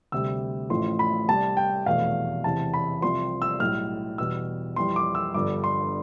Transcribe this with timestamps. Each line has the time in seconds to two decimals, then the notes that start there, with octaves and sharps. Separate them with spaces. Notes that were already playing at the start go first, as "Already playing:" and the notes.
0.12 D2 C3 G3 E6
0.70 A1 A2 F3 A3 C6
0.99 B5
1.28 C2 C3 G3 A5
1.57 G5
1.86 F1 E2 B2 A3 F5
2.44 E2 C3 E3 A5
2.74 B5
3.02 C2 C3 F3 C6
3.42 E6
3.60 B1 A2 G3 F6
4.18 E2 B2 G3 E6
4.76 F2 E3 G3 C6
4.96 D6
5.15 E6
5.34 G1 G2 D3 F3 D6
5.64 C6